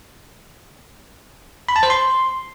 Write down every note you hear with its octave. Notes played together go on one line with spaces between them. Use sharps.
B5
A5
C5
C6